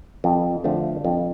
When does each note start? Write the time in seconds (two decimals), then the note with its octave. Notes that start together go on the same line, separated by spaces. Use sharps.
0.24 F2
0.64 D3 F3 A3
1.05 F2